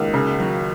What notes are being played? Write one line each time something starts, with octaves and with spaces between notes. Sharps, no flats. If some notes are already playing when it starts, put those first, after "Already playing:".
Already playing: C#2 D#3 A#3 C#4 F#4
C#3
F#3